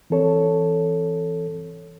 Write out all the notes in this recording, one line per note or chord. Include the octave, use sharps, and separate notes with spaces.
E3 C4 A4 C#5